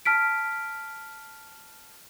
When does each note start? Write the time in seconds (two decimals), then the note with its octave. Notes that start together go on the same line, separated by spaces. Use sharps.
0.05 A5 F6 B6 D7